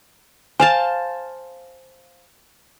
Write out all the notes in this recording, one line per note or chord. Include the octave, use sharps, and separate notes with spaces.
C5 F5 G#5 A5